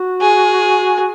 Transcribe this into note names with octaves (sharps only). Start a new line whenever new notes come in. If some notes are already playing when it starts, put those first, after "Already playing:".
Already playing: F#4
G#4